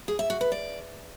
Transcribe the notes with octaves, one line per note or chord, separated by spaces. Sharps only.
G#4
E5
F#4
B4
D5